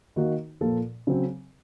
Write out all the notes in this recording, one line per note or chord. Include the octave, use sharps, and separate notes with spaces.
D#3 A#3 D#4 F#4
A#2 F3 A#3 F4 A4
C#3 F#3 C4